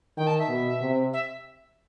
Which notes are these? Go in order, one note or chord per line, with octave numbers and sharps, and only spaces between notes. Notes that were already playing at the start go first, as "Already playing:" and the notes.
D#3 G5
A5
E5
B2
C3
E5